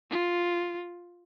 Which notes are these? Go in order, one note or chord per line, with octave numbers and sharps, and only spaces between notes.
F4